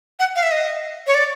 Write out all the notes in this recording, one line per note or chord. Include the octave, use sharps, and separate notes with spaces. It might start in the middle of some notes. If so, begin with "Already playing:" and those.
F#5
F5
E5
D#5
C#5
D5